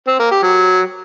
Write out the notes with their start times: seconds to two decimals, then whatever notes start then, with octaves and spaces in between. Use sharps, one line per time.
0.08 C4
0.19 A#3
0.31 G4
0.43 F#3